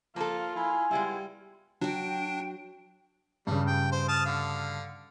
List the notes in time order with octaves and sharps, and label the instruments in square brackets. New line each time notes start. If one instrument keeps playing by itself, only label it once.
[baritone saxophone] F3 [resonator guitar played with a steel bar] A#3 A4 [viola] F4
[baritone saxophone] E4 [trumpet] G#5
[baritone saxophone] G3 [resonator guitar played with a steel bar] G#3 B3 E4
[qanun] F#3 F#4 [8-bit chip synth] D4 [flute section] G5
[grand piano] G2 C#3 [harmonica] G3
[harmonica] G5
C5
A5 D#6 F6
D3 F5